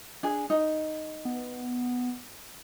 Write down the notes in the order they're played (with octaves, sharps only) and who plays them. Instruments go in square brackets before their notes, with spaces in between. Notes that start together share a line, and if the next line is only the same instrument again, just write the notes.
[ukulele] D4 G#4
D#4
[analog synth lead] B3